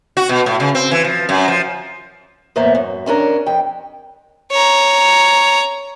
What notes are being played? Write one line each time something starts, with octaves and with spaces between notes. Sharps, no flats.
F#4
B2
A2
C#3
C4
E3
F3
F#2
F3
E2 A2 A#3 B3 C5 E5
F#2
F2 C#4 D4 A#4
F2 G5
C#5 A#5